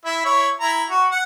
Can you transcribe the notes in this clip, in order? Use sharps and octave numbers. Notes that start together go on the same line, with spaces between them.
E4 E5
E4 C#5
E4 A#5
F#4
F#5